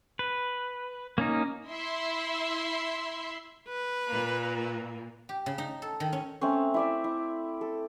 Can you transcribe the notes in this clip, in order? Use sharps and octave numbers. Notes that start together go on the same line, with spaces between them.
B4
A#3 C#4 D#4
E4 E5 C6
B4
A#2 A#3
G4
C#3
D#4
A4
D#3
C#4
A3 C4 C#4
E4 D5 E5
E4
A4